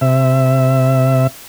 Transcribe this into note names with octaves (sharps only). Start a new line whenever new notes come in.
C3 E5